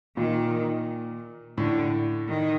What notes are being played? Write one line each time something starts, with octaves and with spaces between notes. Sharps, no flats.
A#2 D#3
A2 D3
D#3